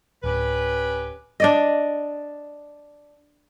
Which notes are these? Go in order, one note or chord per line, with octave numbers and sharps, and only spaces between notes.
D1 C#4 G4 B4
D4 D5 D#5